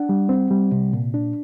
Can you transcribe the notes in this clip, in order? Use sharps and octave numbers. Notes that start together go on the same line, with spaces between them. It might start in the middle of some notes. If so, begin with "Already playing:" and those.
Already playing: D4 F#5
G3
C4
G3
C3
A#2
D4